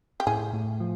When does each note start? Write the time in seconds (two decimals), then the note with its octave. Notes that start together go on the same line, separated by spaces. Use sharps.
0.20 G4
0.27 A2 G#4
0.53 A2
0.80 F3